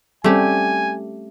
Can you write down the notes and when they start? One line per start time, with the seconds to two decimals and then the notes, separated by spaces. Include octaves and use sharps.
0.24 G3 A3 C4 C#4 G4 G#5